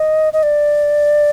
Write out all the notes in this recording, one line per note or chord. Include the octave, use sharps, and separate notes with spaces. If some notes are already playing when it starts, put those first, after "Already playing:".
Already playing: D#5
D#5
D5